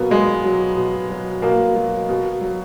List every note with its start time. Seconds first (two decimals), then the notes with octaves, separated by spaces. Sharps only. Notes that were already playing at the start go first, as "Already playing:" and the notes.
Already playing: B2 F#3 A#3 B3
0.10 B2 G#3
0.44 F#3
0.76 B2
1.10 F#3
1.42 B2 A#3
1.75 F#3
2.09 B2
2.41 F#3